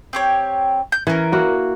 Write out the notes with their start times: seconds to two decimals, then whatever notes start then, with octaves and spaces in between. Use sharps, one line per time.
0.13 C4 G4 C#5
0.92 G6
1.07 E3 C#4 A#4
1.32 A#3 E4 F#4